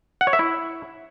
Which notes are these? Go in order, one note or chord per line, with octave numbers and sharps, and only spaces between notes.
F#5
C#5
E5
E4